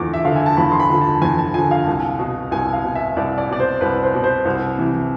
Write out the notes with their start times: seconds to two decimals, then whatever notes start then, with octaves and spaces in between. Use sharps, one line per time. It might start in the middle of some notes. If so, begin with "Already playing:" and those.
Already playing: E2 D3 F3 D6
0.14 E5
0.25 D3 F3 F5
0.36 G#5
0.46 A5
0.57 E2 B5
0.72 C6
0.80 B5
0.90 D3 F3
1.01 A5
1.22 E2 G#5
1.38 A5
1.54 D3 F3 G#5
1.71 F5
1.87 C2
2.19 B2
2.51 C2 G#5
2.73 F5
2.84 B2
2.95 E5
3.16 C2 D5
3.38 D5
3.49 B2 D5
3.60 C5
3.81 C2 B4
4.03 C5
4.14 B2
4.24 C5
4.45 C2
4.78 C3 E3